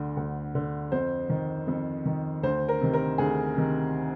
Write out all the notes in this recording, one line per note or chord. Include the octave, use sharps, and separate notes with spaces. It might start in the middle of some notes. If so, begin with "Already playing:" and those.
Already playing: D2 D3
D2
D3
F2 C5
D#3
F2
D#3
D2 C5
A#4
C3 D#3
A#4
D2 G#4
C3 D#3